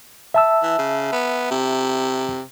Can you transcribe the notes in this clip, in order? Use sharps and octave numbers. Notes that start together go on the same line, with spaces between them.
E5 A5 E6
E3
C#3
B3
C3